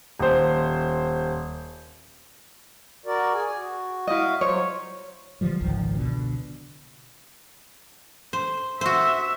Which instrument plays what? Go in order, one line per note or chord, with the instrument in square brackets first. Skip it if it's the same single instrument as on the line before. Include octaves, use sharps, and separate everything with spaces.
[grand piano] D#1 C5
[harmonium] F#4 A#4 D5
G#4 G#5
F#4
[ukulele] E4 D#5 [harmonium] F#4 F5
[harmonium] F#3 C5 [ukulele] C#5
[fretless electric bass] D3 E3 F3 G3
G#1 C#2 D#3 F3
B2 D3
[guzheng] C5
[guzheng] F#4 C5 [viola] E5